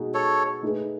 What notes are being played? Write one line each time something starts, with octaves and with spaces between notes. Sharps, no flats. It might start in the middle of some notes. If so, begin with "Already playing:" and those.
Already playing: B2 G#3 D#4 F#4
A4 C#5
A3 D#4 G#4 B4